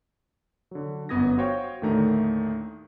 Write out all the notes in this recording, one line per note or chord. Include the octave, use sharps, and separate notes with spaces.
D3 F#3
G1 F#2 B3 D#6 G#6 A#6
F#4 C5 C#5 F5 G5
D#2 A2 D3 D#3 A3 A#5